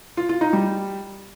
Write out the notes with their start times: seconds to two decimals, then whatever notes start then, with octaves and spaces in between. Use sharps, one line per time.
0.17 F4
0.29 F4
0.41 D#4
0.53 G3